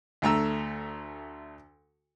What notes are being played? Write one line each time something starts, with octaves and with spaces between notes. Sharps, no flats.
D2 A3 A#5 E6